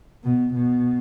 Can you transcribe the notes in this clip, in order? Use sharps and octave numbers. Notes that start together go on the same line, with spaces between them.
B2
B2